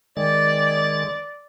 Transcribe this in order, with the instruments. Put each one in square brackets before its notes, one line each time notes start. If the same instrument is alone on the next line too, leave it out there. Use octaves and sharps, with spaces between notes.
[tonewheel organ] D#3 G#3 A6 [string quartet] D5